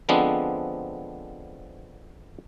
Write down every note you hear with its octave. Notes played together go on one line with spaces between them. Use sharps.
D3 F3 G#3 B3 C4 D4